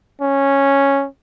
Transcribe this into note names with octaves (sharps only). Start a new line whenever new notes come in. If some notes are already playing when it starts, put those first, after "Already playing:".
C#4